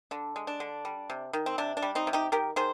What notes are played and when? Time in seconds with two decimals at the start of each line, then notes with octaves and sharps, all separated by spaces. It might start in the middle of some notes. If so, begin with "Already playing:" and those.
0.11 D3 D4
0.36 G#3
0.47 D4
0.60 D3
0.85 G3
1.10 C3
1.33 D#3
1.46 C4
1.58 C3 D4
1.77 D4
1.82 G3
1.95 C4 D#4
2.07 C3
2.13 D#4 G4
2.32 D#3 G4 A#4
2.56 D#3 G#4 C5